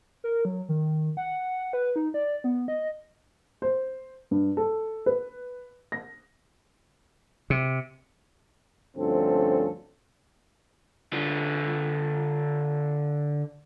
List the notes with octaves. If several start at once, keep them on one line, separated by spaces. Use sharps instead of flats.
A#4
F#3
D#3
F#5
B4
D#4
D5
B3
D#5
C5
G2
A4
B4
A#6
C3
D2 G2 F3 C4 C#4 A4
D3 F4